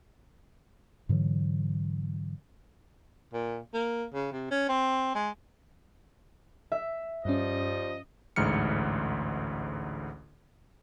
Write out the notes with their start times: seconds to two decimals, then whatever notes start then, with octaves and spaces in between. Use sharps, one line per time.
1.09 G#2 D3 E3 F#3
3.33 A#2
3.74 A#3
4.14 C#3
4.32 C3
4.51 C#4
4.69 C4
5.15 G#3
6.72 E5
7.25 G2 F3 G3 C#4 D#5
8.36 A1 D2 G#2 F6 C#7